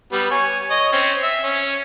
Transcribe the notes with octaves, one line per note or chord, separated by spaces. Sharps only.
G3 B3
C#5 G#5
C#5 D#5
C4 C#4
E5
C#4